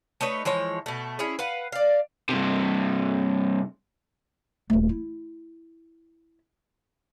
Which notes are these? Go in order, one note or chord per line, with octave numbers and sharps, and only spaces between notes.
A3 D#4 B4 C#5
E3 F3 G#3 C#5
B2 A3
C#4 E4 G#4
B4 F5 F#5
D5 F5
G2 C3
D#1 A3
E4